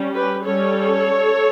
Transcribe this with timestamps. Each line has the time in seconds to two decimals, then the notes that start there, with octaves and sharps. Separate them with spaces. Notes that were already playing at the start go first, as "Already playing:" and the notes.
Already playing: G3 C#4
0.15 G4 B4
0.44 G3 C#4 A4 C#5